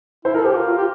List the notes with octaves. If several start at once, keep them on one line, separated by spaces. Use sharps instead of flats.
E4 C5
A4 A#4
G4 C5
F4
F4
G4